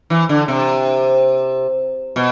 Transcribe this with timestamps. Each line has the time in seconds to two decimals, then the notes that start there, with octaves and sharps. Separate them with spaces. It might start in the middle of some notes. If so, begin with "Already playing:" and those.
0.10 E3
0.29 D3
0.48 C3
2.16 B2